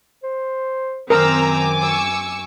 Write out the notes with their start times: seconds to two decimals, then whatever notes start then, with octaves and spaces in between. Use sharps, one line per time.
0.23 C5
1.10 F#2 D#3 C4 A#4 G#5 A#5 D6 E6
1.83 C#6 E6